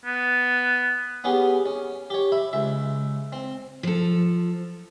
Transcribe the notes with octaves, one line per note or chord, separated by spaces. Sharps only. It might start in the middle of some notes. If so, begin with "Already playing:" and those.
B3
B3 C#4 G4 G#4
C#4
G4 C#5
E5 B5
C#2 E5
C4
F3 A4